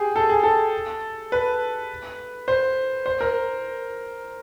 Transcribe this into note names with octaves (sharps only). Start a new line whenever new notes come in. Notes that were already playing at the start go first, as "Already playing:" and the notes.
Already playing: G4 G#4
A4
G#4
A4
B4
C5
C5
A#4